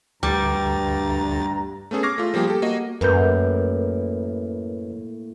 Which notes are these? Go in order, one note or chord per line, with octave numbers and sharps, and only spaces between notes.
D2 G2 G3 A#5 A6
A3 B3 C#4 G#4 A4
C#6 D6 F6 G#6 A#6 C7
A3 F4
F3 G3 A#3 G4 G#4
G4 A4
A#3 F#4 D#5
F#2 A2 A#3 A#4 B4 G6